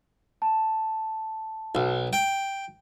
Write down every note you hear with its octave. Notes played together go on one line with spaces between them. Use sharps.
A5
B1
G5